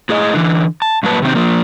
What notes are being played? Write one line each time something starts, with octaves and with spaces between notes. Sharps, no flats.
A2 G#4 D#5
D3 E3
A5
G2 A#2 F#3 A#3 B4 A5
C3 D#3 C4
F3 A#3